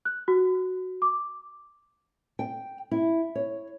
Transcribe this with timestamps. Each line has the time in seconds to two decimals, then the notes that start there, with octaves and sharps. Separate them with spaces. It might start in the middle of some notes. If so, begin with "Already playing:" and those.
0.05 F#6
0.28 F#4
1.02 D6
2.39 G5
2.91 E4
3.35 C#5